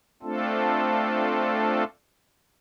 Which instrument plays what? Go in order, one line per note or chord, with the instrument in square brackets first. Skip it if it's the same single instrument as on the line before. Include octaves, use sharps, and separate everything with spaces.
[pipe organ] A3 C4 D4 F4 A4